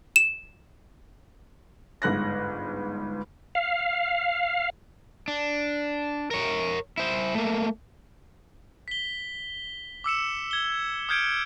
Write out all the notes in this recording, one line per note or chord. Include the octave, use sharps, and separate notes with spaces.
E7
G1 G#2 F#6 A#6
F5
D4
A#4 C#5
E4 C5
A3 A#3
B6 G7
D6 E6 C#7 E7
G#6 G7
D#6 F6 G6 G#6 C#7 D7